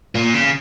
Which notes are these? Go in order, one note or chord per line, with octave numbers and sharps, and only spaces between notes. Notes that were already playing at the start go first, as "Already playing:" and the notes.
A#2
C#3